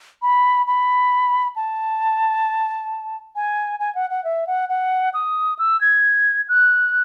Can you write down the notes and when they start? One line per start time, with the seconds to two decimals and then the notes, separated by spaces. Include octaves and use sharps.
0.22 B5
0.67 B5
1.56 A5
3.36 G#5
3.80 G#5
3.95 F#5
4.10 F#5
4.24 E5
4.47 F#5
4.69 F#5
5.14 D#6
5.59 E6
5.81 G#6
6.49 F#6